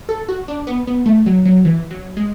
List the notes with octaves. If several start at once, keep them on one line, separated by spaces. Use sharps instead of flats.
A4
F#4
D4
B3
B3
A3
F#3
F#3
E3
F#3
G#3